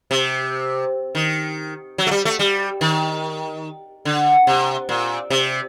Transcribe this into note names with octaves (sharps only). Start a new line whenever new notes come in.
C3
D#3
F#3
A3
G3
A3
G3
D#3
D3
C3
A#2
C3